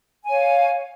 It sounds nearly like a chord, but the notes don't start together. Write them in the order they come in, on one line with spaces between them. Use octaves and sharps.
G#5 C#5 F5